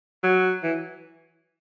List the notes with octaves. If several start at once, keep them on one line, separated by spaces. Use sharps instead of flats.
F#3
E3